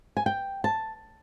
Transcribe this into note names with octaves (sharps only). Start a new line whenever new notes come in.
G#5
G5
A5